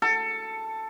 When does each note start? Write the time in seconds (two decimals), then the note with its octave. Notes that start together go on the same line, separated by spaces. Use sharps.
0.02 A4